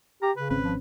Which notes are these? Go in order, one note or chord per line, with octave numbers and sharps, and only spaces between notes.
G4 A#5
C#3 B4
G#1 C4 C#4 B4
F3